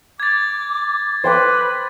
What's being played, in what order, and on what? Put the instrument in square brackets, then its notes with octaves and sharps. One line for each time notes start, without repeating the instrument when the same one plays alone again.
[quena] D6 [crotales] G#6 A6
[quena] B4 [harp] C5 G5 D6